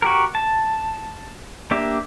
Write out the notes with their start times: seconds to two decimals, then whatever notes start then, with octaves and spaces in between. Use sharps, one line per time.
0.02 F#4 G4 A#4
0.35 A5
1.71 A#3 D4 G4 E5